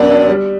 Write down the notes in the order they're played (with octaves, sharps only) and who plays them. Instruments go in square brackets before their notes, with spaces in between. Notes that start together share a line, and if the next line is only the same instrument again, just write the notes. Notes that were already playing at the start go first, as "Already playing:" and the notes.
Already playing: [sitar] F#2 [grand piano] B3 D4
[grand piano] D4
G3